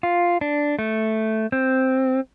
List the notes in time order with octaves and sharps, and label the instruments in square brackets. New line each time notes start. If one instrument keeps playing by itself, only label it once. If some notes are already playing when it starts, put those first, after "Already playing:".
[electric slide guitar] F4
D4
A3
C4